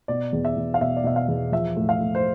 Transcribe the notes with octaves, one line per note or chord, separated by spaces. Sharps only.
B2 D5
E2
E5
E2
F5
B2 E5
D5
B2 E5
F5
E2
F3 E5
A2
F5
A2
C5